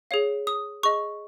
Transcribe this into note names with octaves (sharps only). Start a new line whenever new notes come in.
G#4 C#5 F5
D#6
G#4 D#5 C#6